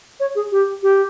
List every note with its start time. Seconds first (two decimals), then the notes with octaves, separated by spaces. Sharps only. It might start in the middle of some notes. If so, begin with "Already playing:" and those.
0.20 C#5
0.35 G#4
0.52 G4
0.83 G4